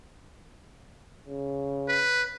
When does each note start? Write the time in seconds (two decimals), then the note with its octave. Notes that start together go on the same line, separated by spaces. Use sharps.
1.27 C#3
1.88 B4